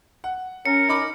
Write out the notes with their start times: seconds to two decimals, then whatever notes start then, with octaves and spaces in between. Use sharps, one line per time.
0.24 F#5
0.65 C#4 A#4 C#7
0.89 D#4 B5 D6